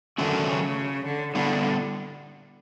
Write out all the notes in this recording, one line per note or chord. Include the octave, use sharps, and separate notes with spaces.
D3 D#3 F#3 A3 C#4 F#4
C#3
D3
D3 G3 B3 E4